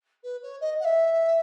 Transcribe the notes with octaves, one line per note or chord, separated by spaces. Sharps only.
B4
C#5
D#5
F#5
E5